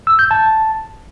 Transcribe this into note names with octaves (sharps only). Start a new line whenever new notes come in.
E6
G6
A5